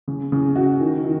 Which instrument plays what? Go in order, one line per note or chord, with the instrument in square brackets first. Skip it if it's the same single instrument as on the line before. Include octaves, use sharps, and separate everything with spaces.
[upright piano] C#3
C#3
F#4
D#3
D#3